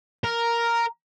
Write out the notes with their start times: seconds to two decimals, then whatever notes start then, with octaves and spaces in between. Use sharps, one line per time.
0.24 A#4